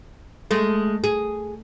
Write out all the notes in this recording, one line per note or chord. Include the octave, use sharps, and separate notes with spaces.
G#3 A3
G#4